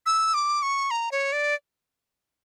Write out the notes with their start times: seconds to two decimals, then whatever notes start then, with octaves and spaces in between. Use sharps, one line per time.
0.06 E6
0.34 D6
0.62 C#6
0.91 A#5
1.11 C#5
1.32 D5